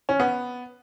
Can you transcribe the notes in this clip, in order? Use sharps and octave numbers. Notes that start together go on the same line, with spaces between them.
C#4
B3